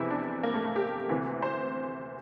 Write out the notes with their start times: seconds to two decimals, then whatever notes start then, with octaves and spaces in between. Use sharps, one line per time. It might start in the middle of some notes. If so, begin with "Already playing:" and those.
Already playing: F1 E2 C3 E3 E4
0.10 D4
0.43 A#3
0.54 A3
0.65 A3
0.76 G4
1.09 D2 C3 E3
1.42 C5